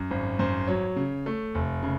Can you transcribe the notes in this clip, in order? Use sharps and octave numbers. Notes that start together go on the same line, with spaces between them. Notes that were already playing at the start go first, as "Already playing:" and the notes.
Already playing: F#2
G#1
F#2 C5
F#3 C#5
C#3
A3
F1
C#3